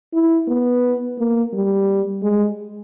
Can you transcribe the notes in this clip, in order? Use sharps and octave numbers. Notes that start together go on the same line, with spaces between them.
E4
B3
A#3
G3
G#3